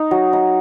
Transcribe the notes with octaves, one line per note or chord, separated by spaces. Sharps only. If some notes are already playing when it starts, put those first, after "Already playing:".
Already playing: D#4
F#3
D#4